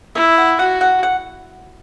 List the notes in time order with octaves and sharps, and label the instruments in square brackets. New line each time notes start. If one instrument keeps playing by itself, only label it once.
[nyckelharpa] E4 [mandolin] E5
[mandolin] F#5
[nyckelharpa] F#4 [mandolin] F#5
[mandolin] F#5
F#5